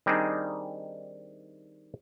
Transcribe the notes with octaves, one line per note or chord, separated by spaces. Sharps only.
D#3 G3 C4 D4 D#4 G#4